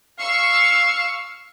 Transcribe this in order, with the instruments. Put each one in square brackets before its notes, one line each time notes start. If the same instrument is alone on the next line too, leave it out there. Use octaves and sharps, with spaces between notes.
[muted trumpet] F5 [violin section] C#6 E6